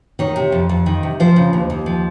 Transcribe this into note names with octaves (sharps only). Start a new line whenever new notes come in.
D#3 C#5
C3
F2
F2
D#3
C3
F3 C5
C#3
D#2
D#2
F3